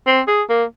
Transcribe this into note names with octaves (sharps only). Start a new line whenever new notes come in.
C4
G#4
A#3